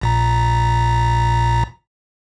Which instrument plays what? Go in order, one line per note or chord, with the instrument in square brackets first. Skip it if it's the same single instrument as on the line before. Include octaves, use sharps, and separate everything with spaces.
[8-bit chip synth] A#1 A#2 A#5